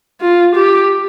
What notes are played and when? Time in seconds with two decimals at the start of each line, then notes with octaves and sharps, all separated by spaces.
0.21 F4
0.55 G4